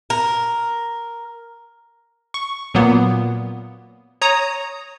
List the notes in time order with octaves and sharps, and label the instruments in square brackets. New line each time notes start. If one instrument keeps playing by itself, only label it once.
[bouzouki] A#4
[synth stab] C#6
A#2 F#3 A#3 B3
C#5 A#5 D#6